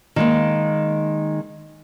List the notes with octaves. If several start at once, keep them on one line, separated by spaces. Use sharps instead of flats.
D#3 G#3 A#3